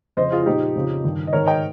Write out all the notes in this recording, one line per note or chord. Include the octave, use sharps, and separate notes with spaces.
F2 C#3 F3 C5 D#5
F4 G#4
F4
A#2 F3 D#4 G4
F2 C#3 F3
G2 D#3
D#5
G#2 D#3 A#4 C#5
D#5 G5